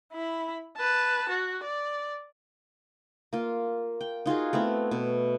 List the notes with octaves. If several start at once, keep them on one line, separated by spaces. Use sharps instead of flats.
E4 B5
B4 A5
F#4
D5
A#3 F4
G5
D#4 F4 F#4 G#4
A3 B3 C4 E4
B2